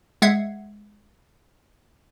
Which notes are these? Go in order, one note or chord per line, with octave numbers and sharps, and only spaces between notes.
G#3 E5 F#5 G#6 C7